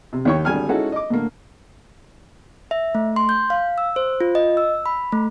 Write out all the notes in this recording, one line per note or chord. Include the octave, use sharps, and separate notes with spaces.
C3
D#2 D#3 C#5 G5 C#6
G#1 D3 G3 G#5 F6
G#3 C#4 D#4 E4 F#4 A4
D#5 D6
A2 D3 A#3
E5
A3
C6
G6
F5
E6
C5
F4
D#5
E6
B5
A3